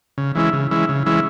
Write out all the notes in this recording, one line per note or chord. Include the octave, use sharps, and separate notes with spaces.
C#3
E3 G#3 C#4 E4
C#3
E3 G#3 C#4 E4
C#3
E3 G#3 C#4 E4